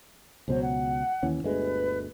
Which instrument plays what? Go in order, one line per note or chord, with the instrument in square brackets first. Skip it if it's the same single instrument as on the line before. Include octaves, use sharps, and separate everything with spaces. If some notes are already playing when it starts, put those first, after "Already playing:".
[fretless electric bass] C#2 B2 F#3 [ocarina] C5
[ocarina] F#5
[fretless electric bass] D#2 E3 C#4
[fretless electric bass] G1 D2 G#3 [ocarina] B4